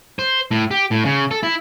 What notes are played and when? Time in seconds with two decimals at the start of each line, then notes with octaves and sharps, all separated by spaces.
0.19 C5
0.51 A2
0.71 G4
0.91 A2
1.05 C#3
1.31 A4
1.43 E4